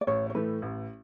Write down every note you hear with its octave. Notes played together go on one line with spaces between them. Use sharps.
D5
A1 C#5
C#5
A2 E3 A3 B4
A1